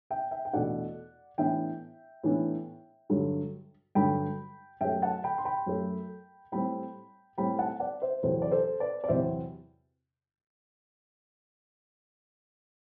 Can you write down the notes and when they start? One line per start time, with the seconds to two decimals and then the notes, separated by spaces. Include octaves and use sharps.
0.10 E5 G5
0.31 E5 G5
0.45 G5
0.53 E2 B2 A3 D4 D5 F#5
1.38 A2 E3 B3 D4 E5 G5
2.24 A2 E3 B3 D4
3.10 G2 D3 F#3
3.95 G2 D3 F#3 G5 B5
4.80 F#2 F#3 A3 E5 G5
5.02 F#5 A5
5.24 G5 B5
5.38 C6
5.45 G5 B5
5.66 F#2 F#3 A3
6.52 A2 G3 C4 G5 B5
7.38 A2 G3 C4 G5 B5
7.59 F#5 A5
7.80 D5 F#5
8.02 C5 E5
8.23 E2 C3 F#3 C4 A4 C5
8.42 D5
8.51 A4 C5
8.80 B4 D5
9.04 D5
9.08 E2 C3 F#3 C4 C5 E5